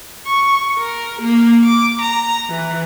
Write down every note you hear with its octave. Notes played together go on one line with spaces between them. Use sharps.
C#6
A#4
A#3
D6
A#5
E3